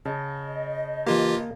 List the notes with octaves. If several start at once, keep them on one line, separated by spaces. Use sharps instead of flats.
C#3 D#5 A5
E3 A#3 F4 G4